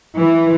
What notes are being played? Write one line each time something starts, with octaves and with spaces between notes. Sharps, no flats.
E3